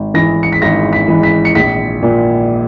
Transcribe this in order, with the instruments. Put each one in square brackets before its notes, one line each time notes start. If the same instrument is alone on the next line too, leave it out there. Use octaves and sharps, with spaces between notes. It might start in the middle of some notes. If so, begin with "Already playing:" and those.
Already playing: [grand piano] G#1
G#2 E3 A#6
C#7
B6
G#1 A#6
B6
G#2 E3
B6
C#7
A#1 B6
A#2